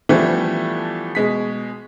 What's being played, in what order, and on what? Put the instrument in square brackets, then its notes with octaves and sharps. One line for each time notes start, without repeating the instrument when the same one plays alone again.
[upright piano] E3 F3 G3 A3 B3 D4
B2 G#3 B6